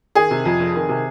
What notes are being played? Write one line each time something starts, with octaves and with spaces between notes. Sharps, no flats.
D#3 G#4
C3
F2
F1
D#3
C3